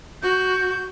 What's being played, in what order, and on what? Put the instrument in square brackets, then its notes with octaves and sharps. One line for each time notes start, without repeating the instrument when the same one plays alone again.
[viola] F#4 [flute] G6